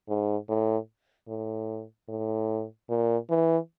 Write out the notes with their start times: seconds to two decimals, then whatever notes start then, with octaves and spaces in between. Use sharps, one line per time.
0.08 G#2
0.49 A2
1.28 A2
2.09 A2
2.89 A#2
3.30 E3